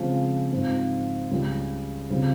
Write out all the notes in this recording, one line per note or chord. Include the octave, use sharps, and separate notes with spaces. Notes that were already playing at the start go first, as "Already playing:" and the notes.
Already playing: C#3 F3 G#3 C4
G#2 F3 C4 F4
C#2 C#3 G3
C#3 G3 C4 F4